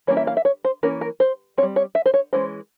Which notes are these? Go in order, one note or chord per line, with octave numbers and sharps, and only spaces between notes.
E3 G3 A#3 C#4 C#5
E5
F5
E5
C#5
C5
E3 A#3 C#4 A#4
A#4
C5
C4 C#5
G3
C#5
E5
C5
C#5
E3 G#3 C#4 C5